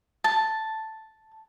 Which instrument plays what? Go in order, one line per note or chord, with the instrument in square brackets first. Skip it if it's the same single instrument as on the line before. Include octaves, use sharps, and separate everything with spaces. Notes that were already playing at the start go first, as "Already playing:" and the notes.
[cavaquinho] A5